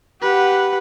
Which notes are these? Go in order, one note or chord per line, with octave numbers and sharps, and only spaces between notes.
G4 B4 F#5